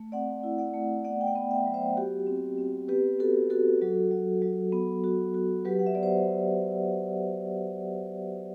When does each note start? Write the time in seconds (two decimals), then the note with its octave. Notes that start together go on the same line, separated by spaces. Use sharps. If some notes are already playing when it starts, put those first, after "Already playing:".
Already playing: A3
0.12 C4 D5 F#5
0.43 E4
0.58 D5 F#5
0.74 A3
1.04 B3 D5 F#5
1.21 G5
1.27 D5 F#5
1.35 B3
1.51 E5 G5
1.66 F#3
1.74 C5 E5
1.96 F#4 G4
2.27 C4
2.58 C4
2.89 B3 G4 B4
3.19 B3 F#4 A4
3.50 F#4 A4
3.81 F#3
4.11 F#3
4.42 F#3
4.73 B3
5.04 F#4
5.34 F#4
5.65 F#3 G4 B4
5.79 F#5
5.87 E5
5.95 B3 D5
6.03 C5